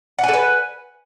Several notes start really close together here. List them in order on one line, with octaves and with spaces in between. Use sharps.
F#5 G#5 A4 B4